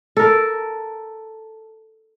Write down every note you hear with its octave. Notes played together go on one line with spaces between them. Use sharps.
A4 A#4